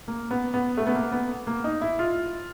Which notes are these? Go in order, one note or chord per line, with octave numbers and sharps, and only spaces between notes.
A#3
B3
B3
A3
B3
A#3
B3
A#3
D#4
E4
F4